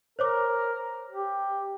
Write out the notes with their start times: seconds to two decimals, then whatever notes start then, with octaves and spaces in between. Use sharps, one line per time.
0.19 A#4 C5 C#5 D6
1.11 G4